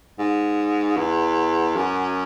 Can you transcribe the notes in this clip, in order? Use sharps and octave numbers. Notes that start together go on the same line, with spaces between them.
G#2
E2
F#2